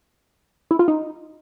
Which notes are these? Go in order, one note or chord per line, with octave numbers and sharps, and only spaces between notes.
E4
F4
D#4